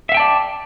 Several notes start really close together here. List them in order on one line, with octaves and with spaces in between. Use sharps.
E5 F5 G5 A5 D5